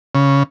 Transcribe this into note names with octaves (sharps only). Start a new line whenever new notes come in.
C#3